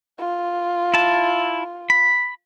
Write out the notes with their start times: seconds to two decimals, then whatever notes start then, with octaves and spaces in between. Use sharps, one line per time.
0.19 F4
0.94 E4 A5
1.90 B5